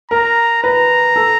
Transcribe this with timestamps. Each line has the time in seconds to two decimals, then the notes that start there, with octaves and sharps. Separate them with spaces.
0.11 A#4 A#5
0.63 B4 A#5
1.16 A4